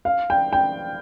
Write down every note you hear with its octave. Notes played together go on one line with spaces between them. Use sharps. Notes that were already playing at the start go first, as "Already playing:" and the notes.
F5
G5
G5